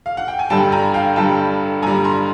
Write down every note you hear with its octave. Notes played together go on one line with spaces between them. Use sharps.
F5
F#5
G5
G#5
G2 D3 G3 G5 A5
G#5 A#5
F5 G5
G2 D3 G3 G5 A5
G2 D3 G3 G#5 A#5
A#5 C6